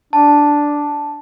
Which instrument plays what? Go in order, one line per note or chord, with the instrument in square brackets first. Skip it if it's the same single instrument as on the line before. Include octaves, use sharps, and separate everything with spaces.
[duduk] D4 [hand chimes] A5